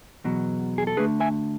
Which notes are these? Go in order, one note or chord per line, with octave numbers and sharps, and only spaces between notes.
E2 B2 F#3
G#4
A4
D2 D3 A3 G#4 B4
E5 G#5